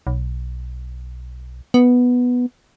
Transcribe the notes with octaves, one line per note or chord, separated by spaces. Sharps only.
B1
B3